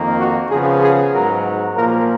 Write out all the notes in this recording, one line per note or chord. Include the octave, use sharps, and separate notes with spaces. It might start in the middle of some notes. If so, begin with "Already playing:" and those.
Already playing: F2 D#3 A#3
F#4
C#3 F3 B3 G#4
G#4
G#2 F#3 B3 A#4
A#2 F3 A#3 A#4